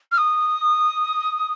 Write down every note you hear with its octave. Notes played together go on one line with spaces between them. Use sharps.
F6
D#6